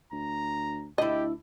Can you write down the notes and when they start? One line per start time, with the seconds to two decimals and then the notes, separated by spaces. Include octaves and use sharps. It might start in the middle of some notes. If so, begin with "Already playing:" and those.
0.13 D2 A#5
0.98 D2 D4 E4 G4 D#5